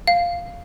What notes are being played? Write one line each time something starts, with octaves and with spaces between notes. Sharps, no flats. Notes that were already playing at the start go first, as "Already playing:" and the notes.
F5